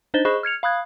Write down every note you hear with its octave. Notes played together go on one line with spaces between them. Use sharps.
D4 D#4 C5 D#5 A6 G7
G#4 C5 D#5 B5 C#6 F#6
F6 G#6 C#7 F7
F5 B5 D#6 F#6 G#6